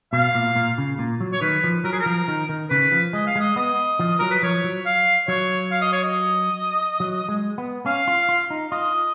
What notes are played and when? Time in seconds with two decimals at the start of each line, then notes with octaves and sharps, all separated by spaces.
0.13 B2 F5
0.35 A#2
0.56 A#2
0.78 C#3
0.99 A#2
1.20 F#3
1.33 C#5
1.41 D#3 B4
1.64 F3
1.84 F#3 A#4
1.93 G#4
1.99 A#4
2.06 F3
2.28 D#3
2.49 D#3
2.70 C#3 B4
2.92 F3
3.13 G#3 D#5
3.27 F5
3.36 G#3 D#5
3.56 B3 D#5
3.99 F3
4.19 F#3 A#4
4.31 B4
4.43 F3 C#5
4.64 F#3
4.86 F5
5.28 F#3 C#5
5.72 F5
5.81 D#5
5.93 C#5
6.04 D#5
7.00 F#3
7.29 G#3
7.58 B3
7.86 C#4 F5
8.08 F4
8.29 F4
8.50 D#4
8.72 F4 D#5